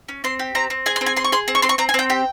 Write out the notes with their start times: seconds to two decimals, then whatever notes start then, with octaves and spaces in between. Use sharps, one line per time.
0.09 C#4
0.24 C4 C6
0.39 G4
0.55 C4 A#5
0.70 C4
0.86 G#4 G#5
0.96 C6
1.01 C4
1.06 G#5
1.16 G#4 C6
1.24 C#6
1.32 G#4 C6
1.48 C4
1.55 C#6
1.62 C4 C6
1.69 C#6
1.78 C4 A#5
1.89 G#5
1.94 C4 G5
2.10 G4 G5